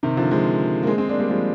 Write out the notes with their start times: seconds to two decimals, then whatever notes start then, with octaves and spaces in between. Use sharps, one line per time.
0.03 C3 D#3
0.17 D3 F3
0.31 F3 G#3
0.83 A#3
0.87 G#3 C4
0.98 G#3 C4
1.09 A#3 D4
1.19 G3 A#3
1.30 F3 G#3